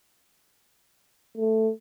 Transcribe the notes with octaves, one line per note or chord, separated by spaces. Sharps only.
A3